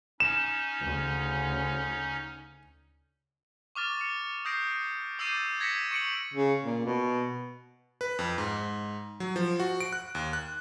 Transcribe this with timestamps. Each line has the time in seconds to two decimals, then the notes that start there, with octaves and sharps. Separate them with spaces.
0.20 C#4 D#4 E7
0.80 D2 C#3
3.75 C#6 D6 F6 A6
4.01 C#7
4.45 D#6 G6 A#6 C7 D7
5.19 D6 E6 G6 A6 C7 D#7
5.60 G#6 A#6 B6 C#7 E7
5.91 C#6 C#7 D7 F#7
6.34 C#3
6.64 A#2
6.86 B2
8.01 B4
8.19 F2
8.38 G#2
9.20 F#3
9.36 F3
9.60 F#4
9.80 D7
9.93 F#6
10.15 D#2
10.33 F#6